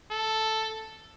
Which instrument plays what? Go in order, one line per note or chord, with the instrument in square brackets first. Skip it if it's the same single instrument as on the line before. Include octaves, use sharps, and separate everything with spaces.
[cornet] A4